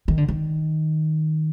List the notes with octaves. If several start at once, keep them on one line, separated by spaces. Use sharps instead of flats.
D#3
D3
D#3